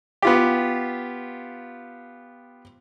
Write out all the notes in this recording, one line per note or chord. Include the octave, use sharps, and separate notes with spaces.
B3 F4 G4